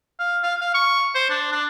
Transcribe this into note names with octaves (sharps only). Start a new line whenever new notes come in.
F5
F5
F5
C#6
C5
D4
D4